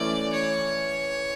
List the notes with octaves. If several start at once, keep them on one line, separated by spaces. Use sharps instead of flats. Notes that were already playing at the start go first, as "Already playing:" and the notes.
Already playing: E3 A3 C#4 D5
C#5